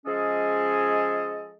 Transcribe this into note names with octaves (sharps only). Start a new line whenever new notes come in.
F3 G#3 C#4 G#4 A4 D#5